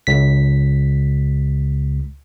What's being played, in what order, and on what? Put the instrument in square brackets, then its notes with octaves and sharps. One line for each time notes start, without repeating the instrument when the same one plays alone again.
[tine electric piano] C#2 B6